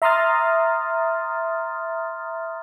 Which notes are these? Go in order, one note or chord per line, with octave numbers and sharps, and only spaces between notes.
E5 A#5 C6 D#6 F6 A6